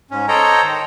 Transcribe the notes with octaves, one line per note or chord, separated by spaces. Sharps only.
G#2 C#4
A4 C5 C#5 D#5 G5 A#5
D#3